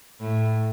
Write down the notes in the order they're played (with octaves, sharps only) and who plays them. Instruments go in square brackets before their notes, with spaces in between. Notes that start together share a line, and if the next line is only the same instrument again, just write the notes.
[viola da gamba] A2